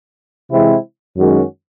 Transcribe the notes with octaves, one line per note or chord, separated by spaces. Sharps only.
C3 E3 G#3 C4 E4
F#2 D#3 G#3 C#4 F#4